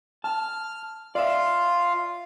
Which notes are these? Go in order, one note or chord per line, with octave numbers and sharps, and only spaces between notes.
A5 F6
F4 D5 E5 F5